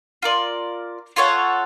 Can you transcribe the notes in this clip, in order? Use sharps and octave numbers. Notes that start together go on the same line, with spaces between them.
F4 A#4 D5
F4 A4 C#5 F#5